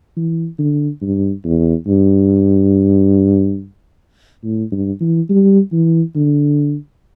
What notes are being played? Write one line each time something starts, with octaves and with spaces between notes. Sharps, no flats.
E3
D3
G2
E2
G2
A2
G2
E3
G3
E3
D3